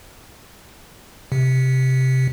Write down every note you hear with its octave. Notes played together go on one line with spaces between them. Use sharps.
C3